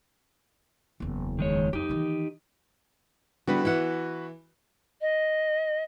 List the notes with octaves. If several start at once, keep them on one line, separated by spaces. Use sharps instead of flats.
F#1 E2
D#3 G#3 C#5
F2 D#4 G4
D#3 E3
D3 G3 B3 E4 F#4 B4
E3 E5 F#5
D#5